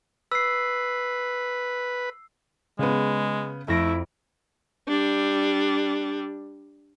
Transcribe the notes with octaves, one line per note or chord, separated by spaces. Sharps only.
B4 E6 C7
C#3 G#3 B3
F2 A3 E4 A#6 D7
G3 D4